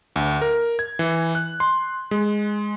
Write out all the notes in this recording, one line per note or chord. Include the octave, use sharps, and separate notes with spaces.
D2
A#4
G#6
E3
F#6
C6
G#3